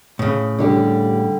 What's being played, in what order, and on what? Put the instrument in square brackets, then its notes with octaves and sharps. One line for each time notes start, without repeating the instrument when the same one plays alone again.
[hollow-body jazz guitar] A2 C#3
[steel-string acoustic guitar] D3 G3 G4